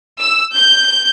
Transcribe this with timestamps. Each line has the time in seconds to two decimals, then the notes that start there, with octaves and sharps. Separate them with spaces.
0.20 E6
0.55 G6